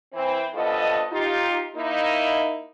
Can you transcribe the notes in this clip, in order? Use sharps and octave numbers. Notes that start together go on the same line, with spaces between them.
E3 C4
G2 F3 B3 A4 D#5
D#4 F4 G4
A#3 D#4 E4